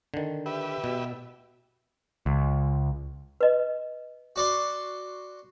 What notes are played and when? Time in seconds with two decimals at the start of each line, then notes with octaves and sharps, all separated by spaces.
0.14 D3 D#3
0.46 G4 B4 E5
0.84 B2
2.26 C#2
3.41 B4 D#5
4.36 F#4 D5 C6